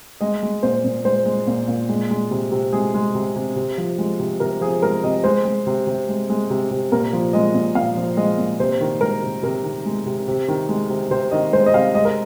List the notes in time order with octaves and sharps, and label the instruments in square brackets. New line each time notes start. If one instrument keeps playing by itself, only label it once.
[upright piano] G#3 D#5
G#3
A#2 C5
A#2
G#3 C5
G#3
A#2
A#2
G#3
G#3
C3
C3
G#3 G#4
G#3
C3
C3
C3
F3
G#3
C3
C3 A#4
F3 G#4
G#3 A#4
C3 D#5
G#3 C5
G#3
C3
C3
G#3
G#3
C3
C3
A#2 A#4
F3
G#3 D#5
A#2
A#2 F5
F3
G#3 D#5
A#2
C3 C5
D#3
G#3 A#4
C3
C3 A#4
D#3
G#3
C3
C3
D#3
G#3
C3
C3 C5
D#3 D#5
G#3 C5
D#5
C3 F5
G#3 D#5
A#4